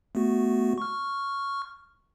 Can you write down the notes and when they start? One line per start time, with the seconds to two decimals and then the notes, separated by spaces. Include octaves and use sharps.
0.15 A3 B3 F#4
0.78 C#6 F6